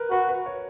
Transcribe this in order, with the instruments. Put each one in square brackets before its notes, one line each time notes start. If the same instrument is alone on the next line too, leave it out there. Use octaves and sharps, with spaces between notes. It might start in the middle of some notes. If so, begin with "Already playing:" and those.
Already playing: [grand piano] A#4 B4
[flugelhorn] F#4 [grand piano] B4
[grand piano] B4
C#5